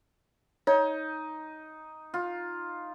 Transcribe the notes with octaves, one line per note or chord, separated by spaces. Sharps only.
D#4 C#5
F4